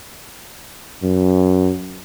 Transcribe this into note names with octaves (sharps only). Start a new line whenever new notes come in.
F#2